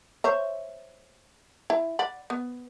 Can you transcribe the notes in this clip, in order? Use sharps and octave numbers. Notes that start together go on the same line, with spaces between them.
C5 C#5 E5
E4
D5 F#5 B5
B3